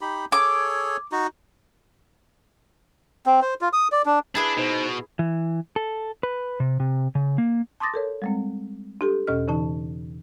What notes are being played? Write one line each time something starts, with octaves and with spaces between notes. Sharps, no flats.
D#4 G4 B5
G#4 A4 C#5 D6
D#4 F#4
C4
C5
F4
D#6
D5
D4
D4 E4 G#4 B4
B2 D#4 C5
E3
A4
B4
C3
C3
C#3
A#3
A5 C6 D6 D#6 A6 A#6
A4 A#4 C#5
G3 G#3 C4
D4 G4 A4
E2 B2 C#4 A4 D#5 F6
C#3 E3 D#4 A5